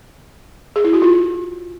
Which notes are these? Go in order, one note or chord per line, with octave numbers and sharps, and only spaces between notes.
G#4
E4
F#4
F4